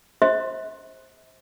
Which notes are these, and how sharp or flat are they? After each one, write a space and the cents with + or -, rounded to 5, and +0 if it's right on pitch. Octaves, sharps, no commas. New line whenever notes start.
C5 +10 E5 -40 C6 +0